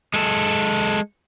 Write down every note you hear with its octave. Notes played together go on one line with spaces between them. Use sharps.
G#3 A4